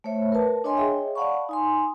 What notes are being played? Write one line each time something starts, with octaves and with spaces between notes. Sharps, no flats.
A3 C5 C#5 E5
A#4 B4 A5
D4 C#5 D#5 G#5 C6
G#4 C#5 D#5 E5 G5
D5 F5 F#5 A5 B5 C#6
D#4 G#5 C6